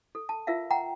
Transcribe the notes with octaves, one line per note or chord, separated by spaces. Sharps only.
A4
A5
F4 A#4 E5 F5
F#5 G5 A#5